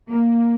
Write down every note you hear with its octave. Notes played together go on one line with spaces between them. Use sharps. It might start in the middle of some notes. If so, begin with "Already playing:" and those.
A#3